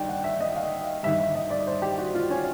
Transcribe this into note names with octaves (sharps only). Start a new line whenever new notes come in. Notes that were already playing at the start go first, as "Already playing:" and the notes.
Already playing: G2 D#3 D5 G5
F#5
E5
D#5
F5
G2 D#3 E5
E5
D#5
D5
C5
G4
F#4
F4
C#4